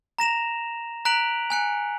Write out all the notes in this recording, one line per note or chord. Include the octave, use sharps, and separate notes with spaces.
A#5 A#6 E7 F7
A#5 F#6 B6 D7 F7 F#7
G#5 F#6 C#7